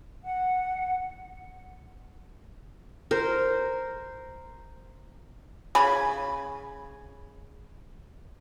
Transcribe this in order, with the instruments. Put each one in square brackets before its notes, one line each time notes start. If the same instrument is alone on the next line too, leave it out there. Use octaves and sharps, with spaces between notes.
[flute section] F#5
[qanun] A#4 C5
[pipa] C#3 G#5 B5